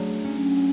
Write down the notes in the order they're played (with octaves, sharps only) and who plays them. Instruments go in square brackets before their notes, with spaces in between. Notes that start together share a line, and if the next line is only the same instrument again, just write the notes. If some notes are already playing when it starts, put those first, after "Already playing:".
Already playing: [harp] F#3 A3 D4 G#4
C#4